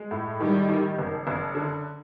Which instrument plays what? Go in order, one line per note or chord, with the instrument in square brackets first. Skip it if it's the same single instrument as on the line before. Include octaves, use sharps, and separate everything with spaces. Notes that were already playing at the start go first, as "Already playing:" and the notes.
Already playing: [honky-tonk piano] G#3
A2
[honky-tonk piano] D#3 [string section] G3
[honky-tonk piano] D#3
F#1
F#1
D3